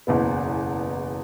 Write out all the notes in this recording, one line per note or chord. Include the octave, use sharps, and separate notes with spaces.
F#1 E2 B2 B3